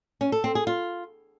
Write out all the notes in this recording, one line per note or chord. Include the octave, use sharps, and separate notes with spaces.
C#4
A4
C4
G#4
F4